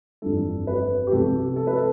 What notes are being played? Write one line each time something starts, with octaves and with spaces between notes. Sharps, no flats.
G1 F2 E3 G3 D4 A4
B4
G4
C2 C3 F3 B3 A4
A4
B4
A4